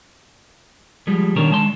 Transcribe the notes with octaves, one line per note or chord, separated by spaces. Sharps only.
F3 G3 G#3
B2 D#3 D4 A#4 C#5
G#3 A5 C6